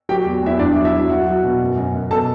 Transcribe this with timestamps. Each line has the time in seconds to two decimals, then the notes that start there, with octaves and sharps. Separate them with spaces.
0.09 F#3 G4 G5
0.25 E2
0.43 E2 E4 E5
0.59 G2 D4 D5
0.76 F#3
0.84 E4 E5
0.93 F#3
1.10 F#3 F#4 F#5
1.27 F#3
1.44 B2
1.61 F#2
1.77 F#2
1.94 F#2
2.11 B2 A4 A5